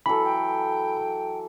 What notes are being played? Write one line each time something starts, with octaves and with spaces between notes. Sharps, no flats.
E3 F#3 A4 B5
G5